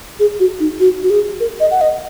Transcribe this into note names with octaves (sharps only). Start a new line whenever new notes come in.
G#4
F#4
D#4
F#4
F#4
G#4
A#4
D#5
F#5
D#5